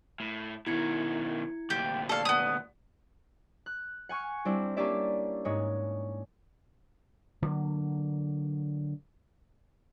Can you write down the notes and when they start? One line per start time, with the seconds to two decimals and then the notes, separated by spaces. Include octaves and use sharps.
0.20 A2
0.67 B2 D#3 E4 G#6 C#7
1.70 D2 A#2 G4
2.09 G4 A4 D5 F5
2.25 B3 D#6
3.66 F#6
4.09 F#5 G#5 C#6 F6 C#7
4.45 G3 C4 D4 E4
4.77 A#3 C#4 D4 G4 D5 E5
5.45 G#2 G#3 C#5
7.42 D3 F#3 A#3